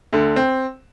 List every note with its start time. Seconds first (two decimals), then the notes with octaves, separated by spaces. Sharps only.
0.13 D2 D3
0.36 C4